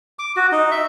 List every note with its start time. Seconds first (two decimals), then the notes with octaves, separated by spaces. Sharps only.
0.19 D6
0.36 F#4
0.52 D#4
0.71 E5